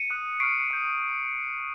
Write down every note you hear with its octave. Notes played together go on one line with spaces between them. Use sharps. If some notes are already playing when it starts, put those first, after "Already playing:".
Already playing: C#7 D#7
D#6 F#6
C#6 F6 C7 D7
D#6 G6